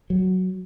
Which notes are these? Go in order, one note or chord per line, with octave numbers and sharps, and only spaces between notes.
F#3